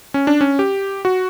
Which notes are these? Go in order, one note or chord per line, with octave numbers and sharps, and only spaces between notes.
C#4
D4
C#4
G4
F#4